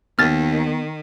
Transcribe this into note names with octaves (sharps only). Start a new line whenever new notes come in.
D#2 D#3 B3 F6 A6